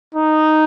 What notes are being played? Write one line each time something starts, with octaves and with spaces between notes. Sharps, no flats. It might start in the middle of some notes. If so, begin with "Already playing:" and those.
D#4